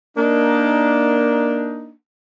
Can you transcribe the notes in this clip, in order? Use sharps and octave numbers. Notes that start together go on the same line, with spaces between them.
A#3 D4 D#4